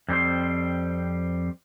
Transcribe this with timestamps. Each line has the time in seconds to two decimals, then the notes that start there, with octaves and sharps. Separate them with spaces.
0.09 F2 G3 C4 C5